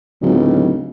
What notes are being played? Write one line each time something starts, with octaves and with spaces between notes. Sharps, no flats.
D1 C#2 F#3 B3 D#4